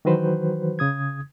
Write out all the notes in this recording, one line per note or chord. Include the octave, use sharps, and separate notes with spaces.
D#3 E3 F#3 F#4 B4 C5
C#3 D#6 G#6